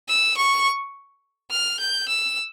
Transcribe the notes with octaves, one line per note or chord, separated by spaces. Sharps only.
E6
C#6
F6
G6
E6